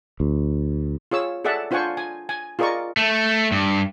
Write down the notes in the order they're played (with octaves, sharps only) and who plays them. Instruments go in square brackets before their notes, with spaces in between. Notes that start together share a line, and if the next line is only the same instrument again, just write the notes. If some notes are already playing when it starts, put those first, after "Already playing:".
[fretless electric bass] D2
[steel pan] F4 G#4 C#5 E6
G#4 A4 D5 E5 F#5 A5
D4 F4 C5 F#5 G#5 C#6
G#5
G#5
F4 G#4 A#4 D5 D#5 C#6
[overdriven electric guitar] A3
G2